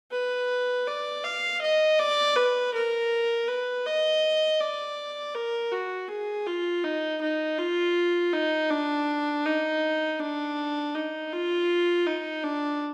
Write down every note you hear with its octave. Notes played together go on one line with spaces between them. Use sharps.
B4
D5
F5
D#5
D5
B4
A#4
B4
D#5
D5
A#4
F#4
G#4
F4
D#4
D#4
F4
D#4
D4
D#4
D4
D#4
F4
D#4
D4